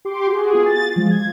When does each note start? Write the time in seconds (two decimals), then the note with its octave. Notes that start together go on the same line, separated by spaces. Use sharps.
0.05 G4 C6 D6
0.27 F#4 G#4
0.51 B3 F4 G#4
0.66 A6
0.96 F3 G#3 F4
1.11 G#6